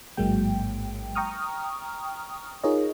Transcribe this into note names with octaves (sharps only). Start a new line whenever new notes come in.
A1 G#2 F#3 G#3 A#3 G5
G5 A#5 C#6 D#6 F6
D#4 F4 G#4 A#4 C#5 D#5